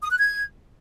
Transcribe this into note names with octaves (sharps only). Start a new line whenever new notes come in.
D#6
F#6
G#6